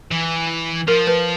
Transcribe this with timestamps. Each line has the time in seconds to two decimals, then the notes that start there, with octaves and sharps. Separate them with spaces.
0.12 E3
0.88 F3 A#4
1.07 B4